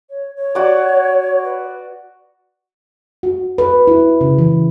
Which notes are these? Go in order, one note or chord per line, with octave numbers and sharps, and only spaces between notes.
C#5
C#5
F#4 D5
B4
F#4
B4
E4
C#3
E3